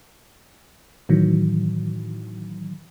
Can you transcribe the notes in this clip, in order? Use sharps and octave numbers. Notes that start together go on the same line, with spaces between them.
A2 D#3 E3 F#3